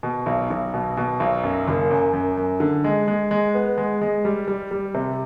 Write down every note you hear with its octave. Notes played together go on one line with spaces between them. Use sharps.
B2
B1
B1
B2
B2
B1
F#2
F#1
F#2
F#2
F#2
D3
G#3
G#3
G#3
B3
G#3
G#3
G3
G3
G3
C3